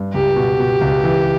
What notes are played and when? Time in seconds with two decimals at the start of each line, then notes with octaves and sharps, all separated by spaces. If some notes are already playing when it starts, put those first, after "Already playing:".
Already playing: G2
0.14 C#2 G4
0.36 B2
0.59 B2
0.81 C#2
1.04 E3